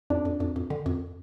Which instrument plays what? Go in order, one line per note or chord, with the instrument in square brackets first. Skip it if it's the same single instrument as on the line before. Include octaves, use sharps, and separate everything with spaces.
[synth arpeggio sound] F2 [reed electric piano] D4
[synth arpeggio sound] F2
F2
F2
D3
F2